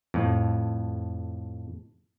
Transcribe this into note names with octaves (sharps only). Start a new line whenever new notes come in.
F2 A2